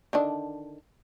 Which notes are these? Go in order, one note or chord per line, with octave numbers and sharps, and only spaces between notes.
D3 D#3 D4